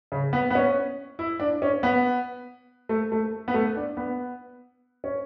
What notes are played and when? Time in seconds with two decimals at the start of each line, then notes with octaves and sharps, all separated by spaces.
0.12 C#3
0.33 B3
0.50 B3
0.55 C#4
1.19 E4
1.40 D4
1.62 C#4
1.83 B3
2.89 A3
3.12 A3
3.48 B3
3.54 A3
3.76 D4
3.97 B3
5.04 C#4